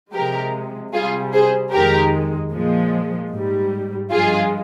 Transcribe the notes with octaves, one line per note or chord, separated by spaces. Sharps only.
C3 F3 G#3 G4 A#4
C3 G3 F4 G#4
G#4 C5
F2 D#3 G#3 G4 A#4
A#2 F3 G#3
G#2 G3
G2 F3 G#3 F4 G#4